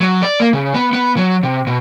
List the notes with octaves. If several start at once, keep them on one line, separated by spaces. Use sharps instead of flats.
F#3
D5
A#3
C#3
B3
B3
F#3
C3
B2